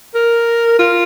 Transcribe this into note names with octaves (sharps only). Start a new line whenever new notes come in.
A#4
F4